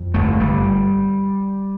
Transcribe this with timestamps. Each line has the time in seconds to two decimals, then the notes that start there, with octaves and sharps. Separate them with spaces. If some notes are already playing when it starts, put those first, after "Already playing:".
Already playing: F2
0.14 G1 A3
0.40 G1 G3